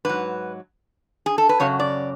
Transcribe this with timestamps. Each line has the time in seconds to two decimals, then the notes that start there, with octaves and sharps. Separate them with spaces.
0.05 G#2 F#3 B4
1.26 G#4
1.38 A4
1.49 B4
1.60 F#2 C#3 F#3 C#5
1.80 D5